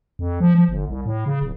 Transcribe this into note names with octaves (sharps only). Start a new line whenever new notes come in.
F2
F3
F3
G1
C2
A2
C#3
D1